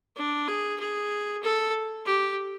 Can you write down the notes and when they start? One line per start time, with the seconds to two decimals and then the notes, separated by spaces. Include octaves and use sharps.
0.17 D4
0.48 G#4
0.80 G#4
1.43 A4
2.05 G4